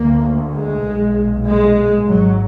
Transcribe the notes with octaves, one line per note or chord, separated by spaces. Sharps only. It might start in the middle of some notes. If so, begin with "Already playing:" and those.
Already playing: D2 A#3
G#3
B1 A#2
G#3
G#1 G#2 F#3